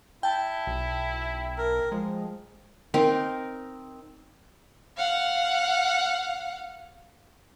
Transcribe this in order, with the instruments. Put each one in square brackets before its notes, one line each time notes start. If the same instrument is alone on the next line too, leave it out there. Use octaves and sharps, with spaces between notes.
[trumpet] E4 [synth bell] G5 A5
[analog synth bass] B1
[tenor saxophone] A#4
[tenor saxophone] F3 [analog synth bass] G#3
[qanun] C4 D#4 A#4
[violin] F5 F#5